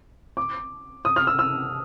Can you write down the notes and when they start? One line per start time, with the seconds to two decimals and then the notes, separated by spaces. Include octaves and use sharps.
0.37 D6
1.05 D#6
1.16 F6
1.27 E6
1.39 E6